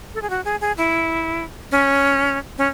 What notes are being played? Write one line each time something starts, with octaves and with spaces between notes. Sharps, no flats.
A4
G#4
F#4
G#4
G#4
E4
C#4
C#4